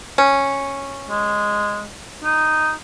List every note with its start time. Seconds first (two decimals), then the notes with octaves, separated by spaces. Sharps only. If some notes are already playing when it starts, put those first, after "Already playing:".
0.18 C#4
1.09 G#3
2.24 D#4